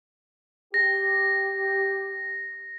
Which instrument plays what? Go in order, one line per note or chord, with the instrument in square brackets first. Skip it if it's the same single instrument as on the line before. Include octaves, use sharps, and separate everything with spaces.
[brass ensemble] G4 [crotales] A#6